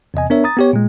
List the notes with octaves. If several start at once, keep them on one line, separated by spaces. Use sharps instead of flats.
E2 C3 D#5 G#5
B3 D4 A#4 C#5 E5
A#5 D#6 A6
B3 G4 C#5
A#2 G#3